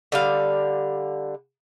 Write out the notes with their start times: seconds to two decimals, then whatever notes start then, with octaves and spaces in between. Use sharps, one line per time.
0.12 D3 G3 F5